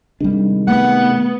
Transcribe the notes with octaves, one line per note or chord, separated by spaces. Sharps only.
C3 D#3 G3 G#3 D4
A3 B3 F#5